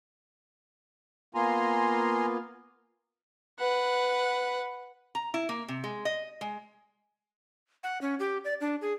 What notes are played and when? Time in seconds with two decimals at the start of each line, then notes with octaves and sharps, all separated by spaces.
1.35 A#3 B3 F4 G#5 A#5 C6
3.59 B4 F#5
5.15 A#5
5.34 E4
5.49 A#3
5.68 C3
5.84 G#3
6.05 D#5
6.41 G#3
7.83 F#5
8.01 C#4
8.20 G4
8.45 D5
8.61 D4
8.81 G#4